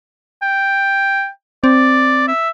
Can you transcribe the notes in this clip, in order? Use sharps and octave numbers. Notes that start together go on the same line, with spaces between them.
G5
C4 D5
E5